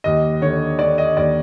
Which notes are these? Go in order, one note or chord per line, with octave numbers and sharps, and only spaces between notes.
D#2 D#5
D3 C#5
D3 D5
D#5
D#2 D5